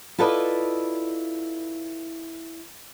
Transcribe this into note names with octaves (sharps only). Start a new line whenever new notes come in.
E4 F4 A4 B4 D5 D#5